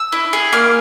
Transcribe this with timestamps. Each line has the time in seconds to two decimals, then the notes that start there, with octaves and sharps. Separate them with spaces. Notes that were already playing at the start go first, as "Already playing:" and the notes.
Already playing: E6
0.12 E4
0.33 G#4
0.53 A#3 F6